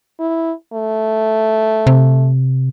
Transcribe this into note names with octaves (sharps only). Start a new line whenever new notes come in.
E4
A3
C3